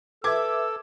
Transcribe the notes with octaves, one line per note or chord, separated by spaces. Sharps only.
A4 B4 E5 D6 E6 G#6